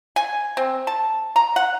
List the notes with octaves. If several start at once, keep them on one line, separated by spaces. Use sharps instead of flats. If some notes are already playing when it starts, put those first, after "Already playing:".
G#5
C4
A5
A#5
F#5